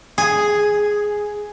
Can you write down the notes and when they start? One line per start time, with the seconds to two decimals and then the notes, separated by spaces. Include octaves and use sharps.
0.18 G#4